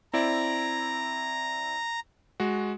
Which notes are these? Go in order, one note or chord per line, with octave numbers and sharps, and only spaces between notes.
C4 E4 D5 A#5
G#3 F#4